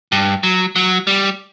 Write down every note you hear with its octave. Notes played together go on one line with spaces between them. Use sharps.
G2
F#3
F#3
G3